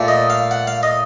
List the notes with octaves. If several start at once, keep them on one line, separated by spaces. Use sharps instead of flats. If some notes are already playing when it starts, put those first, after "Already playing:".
Already playing: A#2 A3
D#5
F5
F#5
F5
D#5